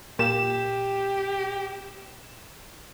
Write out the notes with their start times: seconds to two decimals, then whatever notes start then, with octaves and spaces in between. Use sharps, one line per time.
0.19 A#2 G4 E7